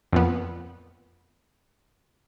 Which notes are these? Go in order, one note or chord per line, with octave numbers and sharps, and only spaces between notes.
F2 A#2 B3